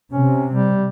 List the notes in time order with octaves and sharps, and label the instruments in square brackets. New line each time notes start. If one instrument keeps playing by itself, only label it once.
[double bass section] C3 [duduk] C#4
[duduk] G3